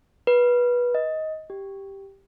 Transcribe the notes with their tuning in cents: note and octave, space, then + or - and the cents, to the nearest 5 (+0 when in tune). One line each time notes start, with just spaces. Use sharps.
B4 -20
D#5 +15
G4 +0